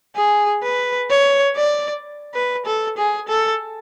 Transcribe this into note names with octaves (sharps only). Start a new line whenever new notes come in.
G#4
B4
C#5
D5
B4
A4
G#4
A4